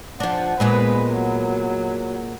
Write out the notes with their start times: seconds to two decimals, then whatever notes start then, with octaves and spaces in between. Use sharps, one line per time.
0.20 F3 D4 F#5
0.60 A#2 G#3 B3 B4
1.12 F#3